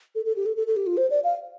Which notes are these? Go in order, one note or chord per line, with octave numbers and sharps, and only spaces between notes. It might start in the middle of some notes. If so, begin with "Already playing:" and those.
A4
A4
G4
A4
A4
A4
G4
F4
C5
D5
F5